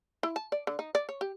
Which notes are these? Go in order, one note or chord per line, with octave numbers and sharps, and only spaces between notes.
E4
A5
D5
D3
D#4
D5
C#5
G4